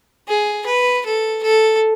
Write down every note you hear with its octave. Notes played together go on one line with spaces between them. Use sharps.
G#4
B4
A4
A4